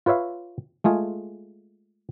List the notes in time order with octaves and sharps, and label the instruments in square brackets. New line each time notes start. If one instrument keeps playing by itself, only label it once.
[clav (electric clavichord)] F4 B4 C#5 E5 F5
G#3 A3 F4 G#4